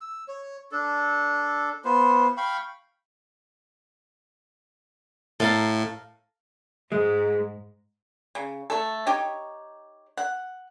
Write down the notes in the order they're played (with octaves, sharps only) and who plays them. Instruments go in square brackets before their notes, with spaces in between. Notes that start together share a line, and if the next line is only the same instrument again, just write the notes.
[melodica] E6
C#5
D4 A4
B3 F4 C5
F5 G5 B5 C#6
[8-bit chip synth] A2 [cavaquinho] A4 F5 A#5
[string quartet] G#2 [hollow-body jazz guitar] G#3
[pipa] C#3
A3 A4
D#4 G4 C#5
F#5